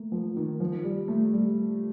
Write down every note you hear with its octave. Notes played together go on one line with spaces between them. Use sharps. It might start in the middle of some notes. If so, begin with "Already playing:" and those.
Already playing: A3 A#3
F3
D#3
F3
G3
A3
G3